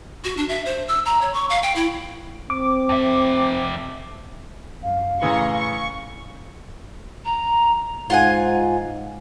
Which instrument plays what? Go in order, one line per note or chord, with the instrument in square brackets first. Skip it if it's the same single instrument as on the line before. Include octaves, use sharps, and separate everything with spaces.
[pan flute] F#4
D4
E5
C5
E6
A#5
C#5
C#6
F5
G5
E4
[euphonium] C4 [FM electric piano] D6
[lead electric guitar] F2 E5
[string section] F#2 [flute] F5
[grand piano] A2 C#3 E3 [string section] A#5 C6 C#6
[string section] C#6
[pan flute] A#5
[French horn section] G#2 [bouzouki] F4 F#5 G#5